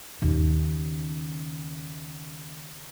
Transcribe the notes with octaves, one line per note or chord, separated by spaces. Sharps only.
D#2 C#3